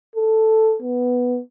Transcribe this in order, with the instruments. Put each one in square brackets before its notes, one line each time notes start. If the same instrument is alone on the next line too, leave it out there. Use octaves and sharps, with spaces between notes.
[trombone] A4
B3